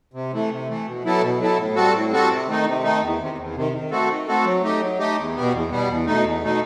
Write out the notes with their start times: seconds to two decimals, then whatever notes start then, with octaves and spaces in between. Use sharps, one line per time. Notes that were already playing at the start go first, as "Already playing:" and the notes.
0.14 C3
0.32 E3 A3
0.50 C3
0.68 E3 A3
0.85 B2
1.04 F#3 B3 E4 A4
1.21 B2
1.39 F#3 B3 E4 A4
1.58 A2
1.75 G3 C4 F#4 A4
1.94 A2
2.11 G3 C4 F#4 A4
2.29 C3
2.47 D#3 A3 D#4
2.66 C3
2.83 D#3 A3 D#4
3.01 E2
3.20 C3 D#3
3.38 E2
3.55 C3 D#3
3.73 D#3
3.91 A3 C4 F#4 A4
4.09 D#3
4.27 A3 C4 F#4 A4
4.44 F#3
4.63 A3 D#4 G4
4.80 F#3
4.99 A3 D#4 G4
5.17 E2
5.35 B2 G3 B3
5.52 E2
5.71 B2 G3 B3
5.88 E2
6.07 B2 A3 D#4
6.24 E2
6.43 B2 A3 D#4